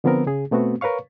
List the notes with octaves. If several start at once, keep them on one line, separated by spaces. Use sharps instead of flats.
D3 F3 B3 C4 A#4
C#3 G#4
B2 A3 B3 C4 F#4
A#4 B4 C#5 F5 C#6